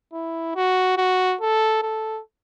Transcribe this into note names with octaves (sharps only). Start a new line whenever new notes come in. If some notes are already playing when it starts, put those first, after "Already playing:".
E4
F#4
F#4
A4
A4